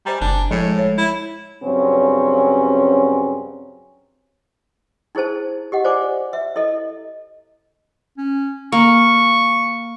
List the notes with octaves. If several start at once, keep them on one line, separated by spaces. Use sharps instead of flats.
G3 C5 G#5 A#5
F#1 D4
A2 F3 G#3 G#6
C#5
E4
G2 C#3 F#3 C4 C#4
D#4 E4 G#4 C5 A5
G4 D#5 F#5
F4 C5 D5 G#5 D6
E5
E4 A4 D#5
C#4
A#3 C#6